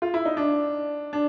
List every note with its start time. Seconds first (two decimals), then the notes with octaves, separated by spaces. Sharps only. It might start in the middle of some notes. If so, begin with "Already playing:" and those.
0.02 F4
0.14 E4
0.25 D#4
0.37 D4
1.13 D4